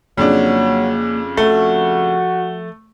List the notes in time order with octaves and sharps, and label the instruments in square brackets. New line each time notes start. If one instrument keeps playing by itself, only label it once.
[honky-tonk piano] F2 C#3 D4 [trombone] F#3 [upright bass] A#3
[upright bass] F3 [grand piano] A3 [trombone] F#4